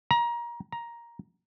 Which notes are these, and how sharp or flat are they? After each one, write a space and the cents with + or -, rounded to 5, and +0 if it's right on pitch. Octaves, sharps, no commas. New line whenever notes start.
A#5 +25
A#5 +10